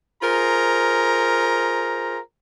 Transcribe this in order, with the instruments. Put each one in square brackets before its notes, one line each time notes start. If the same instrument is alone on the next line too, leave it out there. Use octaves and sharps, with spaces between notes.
[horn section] F4 G#4 A#4 C5 A#5